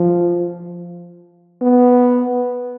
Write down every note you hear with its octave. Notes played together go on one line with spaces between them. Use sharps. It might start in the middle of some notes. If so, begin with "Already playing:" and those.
Already playing: F3
B3